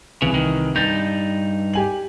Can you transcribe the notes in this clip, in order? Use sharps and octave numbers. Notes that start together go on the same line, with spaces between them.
C2 C#3 E3
D#3
G2 D#4 G6 A6
G4 G#5 F#7